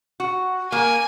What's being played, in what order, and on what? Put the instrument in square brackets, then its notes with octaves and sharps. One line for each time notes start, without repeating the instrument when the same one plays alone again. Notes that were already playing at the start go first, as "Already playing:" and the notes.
[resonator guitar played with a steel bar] F#4
[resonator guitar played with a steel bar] A#3 [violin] G#5